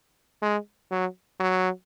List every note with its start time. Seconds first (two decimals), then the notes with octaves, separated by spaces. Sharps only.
0.42 G#3
0.91 F#3
1.40 F#3